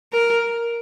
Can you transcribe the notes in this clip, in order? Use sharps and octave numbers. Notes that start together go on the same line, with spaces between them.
A#4